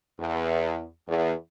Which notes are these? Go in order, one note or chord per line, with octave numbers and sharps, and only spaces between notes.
E2
E2